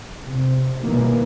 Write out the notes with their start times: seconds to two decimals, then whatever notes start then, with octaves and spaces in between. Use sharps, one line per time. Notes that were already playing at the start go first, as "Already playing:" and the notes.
0.24 C3
0.81 B2 D#3 E3 G3 A#3